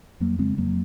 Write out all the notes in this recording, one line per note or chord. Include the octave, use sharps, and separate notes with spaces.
F2 F#3 A#3
C#3 G#3 C4
F2 F#3 A#3